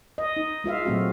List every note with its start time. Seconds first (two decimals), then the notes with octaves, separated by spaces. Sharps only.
0.18 D#5
0.37 D#4
0.64 G#3 F4 E5 F5
0.86 A#2 F#3 A3 C4 F#4